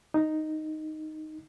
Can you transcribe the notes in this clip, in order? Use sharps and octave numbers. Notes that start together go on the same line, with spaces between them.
D#4